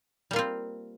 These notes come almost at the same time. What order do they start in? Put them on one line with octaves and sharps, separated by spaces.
G3 A#3 F4 C4